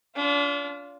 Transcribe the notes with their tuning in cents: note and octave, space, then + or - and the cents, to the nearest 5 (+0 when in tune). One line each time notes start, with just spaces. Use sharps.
D4 -40 F4 +0